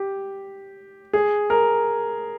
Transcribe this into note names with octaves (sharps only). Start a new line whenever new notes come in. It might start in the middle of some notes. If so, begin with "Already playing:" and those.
Already playing: G4
G#4
A#4